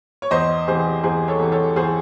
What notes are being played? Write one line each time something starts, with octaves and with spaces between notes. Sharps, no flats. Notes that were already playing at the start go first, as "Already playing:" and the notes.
C#5
E2 C5 D#5
C3 E3 G#4 C5
E2 G#4 C5
A4 C#5
C3 E3
A4 C#5
E2 G#4 C5